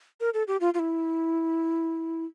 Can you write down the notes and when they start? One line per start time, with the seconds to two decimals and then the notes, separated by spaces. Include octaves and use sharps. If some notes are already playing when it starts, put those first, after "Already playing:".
0.20 A#4
0.34 A4
0.48 G4
0.61 F4
0.74 F4
0.79 E4